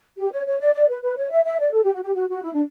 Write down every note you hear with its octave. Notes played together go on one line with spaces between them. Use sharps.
G4
C#5
C#5
D5
D5
B4
B4
C#5
E5
E5
D5
A4
G4
F#4
G4
F#4
F#4
E4
D4